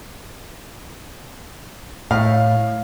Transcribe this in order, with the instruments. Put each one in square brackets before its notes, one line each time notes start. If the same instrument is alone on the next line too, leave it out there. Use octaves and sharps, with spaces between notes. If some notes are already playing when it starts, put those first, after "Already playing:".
[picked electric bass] A2 [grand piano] F5